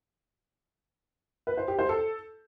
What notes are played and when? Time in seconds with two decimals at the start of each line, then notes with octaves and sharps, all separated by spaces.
1.47 B4
1.57 C5
1.68 G4
1.79 C5
1.89 A4